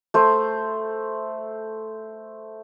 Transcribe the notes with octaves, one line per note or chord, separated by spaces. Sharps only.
A3 C5